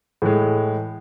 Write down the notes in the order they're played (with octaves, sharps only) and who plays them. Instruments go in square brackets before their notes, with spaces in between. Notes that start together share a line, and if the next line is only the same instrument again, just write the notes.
[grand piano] A2 E3 G#3